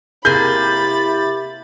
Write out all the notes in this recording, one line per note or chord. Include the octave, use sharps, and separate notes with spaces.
C3 A#3 E4 G4 G#4 B5 G6 A6